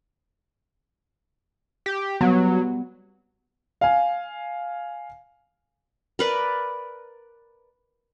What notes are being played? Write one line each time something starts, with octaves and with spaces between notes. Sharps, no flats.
G4
F#3 G3 B3
F5 G#5
A#4 B4 D5